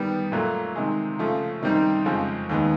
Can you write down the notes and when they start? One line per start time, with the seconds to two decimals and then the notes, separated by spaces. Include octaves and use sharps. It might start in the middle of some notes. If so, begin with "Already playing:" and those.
Already playing: D#3 G3 B3
0.32 A#2 F#3 A3
0.76 C3 D#3 G#3
1.19 C#3 F3 A3
1.62 C3 D#3 G3 C4 D#4
2.05 F2 C#3 F3 G#3
2.49 D#2 D#3 G#3 B3